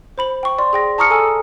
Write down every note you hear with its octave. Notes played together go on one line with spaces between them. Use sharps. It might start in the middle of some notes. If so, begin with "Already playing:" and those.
C5 B5 F#7
G5 C#6
D5 C6
G#4 G5 A#6
A5 A#5 C#6 D#6 F6 C#7
A4 G#5 E6